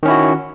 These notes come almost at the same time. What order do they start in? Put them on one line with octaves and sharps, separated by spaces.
D#3 C#4 E4 F#4